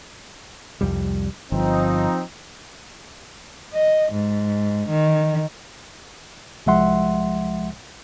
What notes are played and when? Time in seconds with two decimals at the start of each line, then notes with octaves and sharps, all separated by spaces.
0.81 C2 F2 G3
1.52 G1 F3 C4 D#4
3.73 D#5
4.11 G#2
4.88 D#3
6.66 C2 F3 G#3 E5 F#5 C6